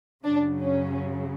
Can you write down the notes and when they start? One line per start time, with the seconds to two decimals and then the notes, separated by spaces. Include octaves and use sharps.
0.24 F#2 C#3 F#3 D4
0.61 C#4